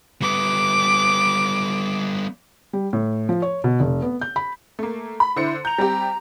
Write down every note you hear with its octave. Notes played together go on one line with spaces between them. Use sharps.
G3 B3 D6
G3
A2
F3
C#5
B2
F1
B3
G6
B5
A3 A#3
B5
D3 E4 C5 C#7
A#5 G6 F7
G3 C4 G4